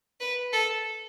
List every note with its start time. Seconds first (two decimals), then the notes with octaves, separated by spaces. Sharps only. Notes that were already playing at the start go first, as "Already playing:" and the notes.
0.20 B4
0.53 A4